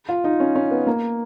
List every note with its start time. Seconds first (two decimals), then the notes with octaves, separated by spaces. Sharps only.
0.09 F4
0.24 D#4
0.40 C#4
0.55 C#4
0.71 B3
0.87 A#3